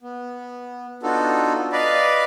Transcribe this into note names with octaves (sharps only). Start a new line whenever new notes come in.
B3
B3 D4 D#4 F4 F#4 A4
B4 D5 D#5 F5 B5